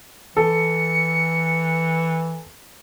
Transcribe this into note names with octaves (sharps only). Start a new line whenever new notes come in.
E3 A4 C#7